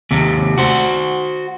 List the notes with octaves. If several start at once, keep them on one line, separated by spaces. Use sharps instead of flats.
D#2 C3
F#4 C5